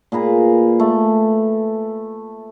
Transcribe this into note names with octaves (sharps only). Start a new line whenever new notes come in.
A#2 G#4 B4 A#5
A3